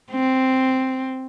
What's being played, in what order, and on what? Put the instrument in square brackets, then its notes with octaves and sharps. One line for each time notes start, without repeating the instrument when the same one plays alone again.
[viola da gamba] C4